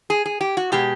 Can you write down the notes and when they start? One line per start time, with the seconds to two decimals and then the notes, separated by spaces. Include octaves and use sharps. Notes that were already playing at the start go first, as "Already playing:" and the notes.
0.10 G#4
0.26 G#4
0.41 G4
0.57 F#4
0.72 B2 G#3 G4